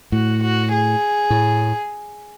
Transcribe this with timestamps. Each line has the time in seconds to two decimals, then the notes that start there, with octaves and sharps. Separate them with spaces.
0.12 A2 F#4
0.42 F#4
0.72 G#4
1.30 A2